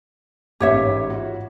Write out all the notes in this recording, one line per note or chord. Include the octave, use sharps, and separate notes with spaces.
A1 G#2 G4 C#5 E5
F4 F#4